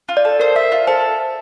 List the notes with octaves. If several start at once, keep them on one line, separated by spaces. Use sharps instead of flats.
F4
D5
A4
A#4 C5
E5
F4
A4 C5